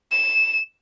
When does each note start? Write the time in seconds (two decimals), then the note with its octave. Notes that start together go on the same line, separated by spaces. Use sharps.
0.12 E7